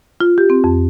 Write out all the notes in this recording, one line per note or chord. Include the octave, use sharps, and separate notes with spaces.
F4
G4
C4
F2